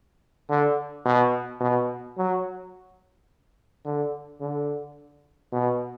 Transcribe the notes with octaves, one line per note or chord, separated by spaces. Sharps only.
D3
B2
B2
F#3
D3
D3
B2